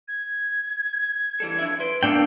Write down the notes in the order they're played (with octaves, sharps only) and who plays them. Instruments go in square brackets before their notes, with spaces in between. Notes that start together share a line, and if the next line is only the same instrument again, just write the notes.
[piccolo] G#6
[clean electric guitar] E3 G3 A4
F3 D4 E5
[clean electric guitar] B4 C6 [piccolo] D7
[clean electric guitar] F#2 B2 D#3 [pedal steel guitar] A#3 D4 G5 [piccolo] E6